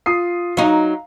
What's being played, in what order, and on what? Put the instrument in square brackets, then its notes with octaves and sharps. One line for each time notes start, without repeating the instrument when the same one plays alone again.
[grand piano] F4 D#6 C7
[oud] F#3 D#4 [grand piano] F5 A#5